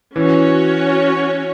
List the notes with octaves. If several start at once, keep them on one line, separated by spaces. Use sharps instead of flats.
E3 C#4 F#4 C#5